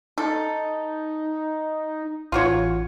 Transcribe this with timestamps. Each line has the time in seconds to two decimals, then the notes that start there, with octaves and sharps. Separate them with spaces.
0.18 D#4 A4
2.32 A1 F4 F#4 C#5